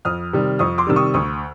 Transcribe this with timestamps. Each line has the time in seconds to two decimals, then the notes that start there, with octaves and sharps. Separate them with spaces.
0.05 F2 D#6 F6
0.33 C3 D#3 G3
0.59 F2 C#6 D#6
0.78 C6 D6
0.87 C3 D#3 G3 E6
0.96 C#6 D#6
1.14 D2 C#6 D#6